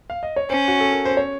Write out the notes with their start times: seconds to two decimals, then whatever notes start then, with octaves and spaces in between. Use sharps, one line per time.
0.10 F5
0.23 D#5
0.36 C#5
0.50 C#4 C5
0.68 F#4
0.81 A4
0.92 A#4
1.05 C5
1.17 C#5